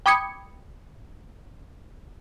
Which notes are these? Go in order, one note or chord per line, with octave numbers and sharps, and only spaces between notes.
G5 B5 D6 D#6 G#6 C#7